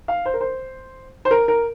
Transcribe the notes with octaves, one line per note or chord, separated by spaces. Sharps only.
F5
C5
A#4
C5
C5
A#4
A#4